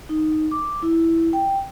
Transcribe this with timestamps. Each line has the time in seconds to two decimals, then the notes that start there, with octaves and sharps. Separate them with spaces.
0.09 D#4
0.51 D6
0.82 E4
1.33 G5